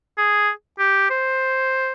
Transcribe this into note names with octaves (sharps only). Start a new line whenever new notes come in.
G#4
G4
C5